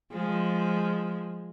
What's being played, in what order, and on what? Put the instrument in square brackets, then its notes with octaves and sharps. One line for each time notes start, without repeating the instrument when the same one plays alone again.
[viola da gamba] F3 G#3